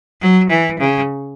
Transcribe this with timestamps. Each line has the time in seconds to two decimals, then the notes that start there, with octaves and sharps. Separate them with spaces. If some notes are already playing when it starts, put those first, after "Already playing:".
0.21 F#3
0.50 E3
0.79 C#3